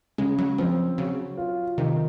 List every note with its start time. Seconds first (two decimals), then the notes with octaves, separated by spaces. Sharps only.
0.18 C#3 G#3
0.38 F#3
0.58 F3 C4
0.97 C#3 F#3
1.37 F4
1.78 C3 D#3